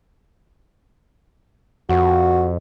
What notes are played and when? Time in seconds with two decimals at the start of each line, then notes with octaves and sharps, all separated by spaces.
1.89 F2 F#4